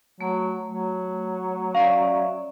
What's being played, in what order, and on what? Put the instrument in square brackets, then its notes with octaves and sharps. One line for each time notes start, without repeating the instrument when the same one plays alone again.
[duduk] F#3 [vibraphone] A3
[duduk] F#3
[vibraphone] C#4 D5 E5 [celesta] F5